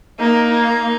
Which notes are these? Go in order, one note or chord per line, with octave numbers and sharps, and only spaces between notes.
A#3 D#4
D#4